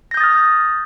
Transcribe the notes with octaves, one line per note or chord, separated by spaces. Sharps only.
D#6 F6 G6 A6 A#6